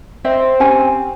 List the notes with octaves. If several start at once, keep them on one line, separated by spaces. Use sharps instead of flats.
C4 D#5 E5
C#4 G4 G#5